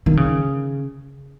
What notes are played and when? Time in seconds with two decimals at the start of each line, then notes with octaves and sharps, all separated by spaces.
0.06 D#3
0.17 C#3